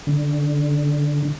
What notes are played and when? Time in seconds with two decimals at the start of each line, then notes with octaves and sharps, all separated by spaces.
0.07 D3